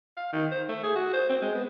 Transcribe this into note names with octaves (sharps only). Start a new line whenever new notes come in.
F5
D#3
C5
A3
G#4
F#4
C5
C4
G#3
B3